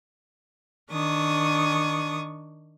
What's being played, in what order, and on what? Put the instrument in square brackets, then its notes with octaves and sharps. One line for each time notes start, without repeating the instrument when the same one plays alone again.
[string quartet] D#3 D4 C#6 D#6